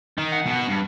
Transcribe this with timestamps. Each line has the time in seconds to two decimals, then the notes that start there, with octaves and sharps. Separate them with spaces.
0.18 D#3
0.32 F#5
0.46 B2 B3
0.68 G2